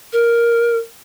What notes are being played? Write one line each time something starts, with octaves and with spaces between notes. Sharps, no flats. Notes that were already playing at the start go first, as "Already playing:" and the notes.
A#4